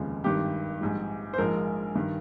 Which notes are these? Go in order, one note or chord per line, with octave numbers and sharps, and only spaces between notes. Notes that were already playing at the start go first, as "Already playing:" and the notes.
Already playing: F1 D#2 C#3 F3 G#3
G#1 G2 D#3 G4
A#1 G#2 G3
C5
A#1 G#2 F3 G#3 A#4
G2 D#3